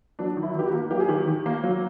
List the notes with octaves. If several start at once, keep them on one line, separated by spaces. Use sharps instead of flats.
F#3 D4
D#3
E4
D#3 G4
F#4
A#3
F#3 G4
G#4
D#3 G4
D#3
A#3
F#3